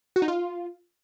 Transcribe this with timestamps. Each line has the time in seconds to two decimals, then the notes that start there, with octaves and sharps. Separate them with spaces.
0.16 F#4
0.22 D#4
0.28 F4